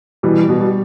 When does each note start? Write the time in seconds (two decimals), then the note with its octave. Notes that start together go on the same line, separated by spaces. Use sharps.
0.23 B2 E3 G3
0.49 B2
0.60 G3